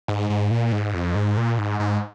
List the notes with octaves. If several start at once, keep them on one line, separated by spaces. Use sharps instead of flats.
G#2
G#2
A#2
G#2
F2
G#2
A#2
G#2
G#2